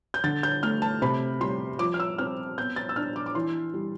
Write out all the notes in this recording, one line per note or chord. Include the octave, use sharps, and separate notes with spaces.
G6
D3 A6
G6
A3 F6
A5
C3 B5
G3 C6
F3 D6
F6
E6
C4 F6
B3 G6
A6
E6
D4 F6
D6
D6
E3 C6
G3